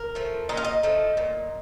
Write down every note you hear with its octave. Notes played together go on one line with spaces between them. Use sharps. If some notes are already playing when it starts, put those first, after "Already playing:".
Already playing: A#4
F3 A3
A#2 D#5
F5
D#5
F3 A3
A#2